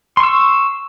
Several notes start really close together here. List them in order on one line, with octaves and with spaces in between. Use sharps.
C6 C#6 E6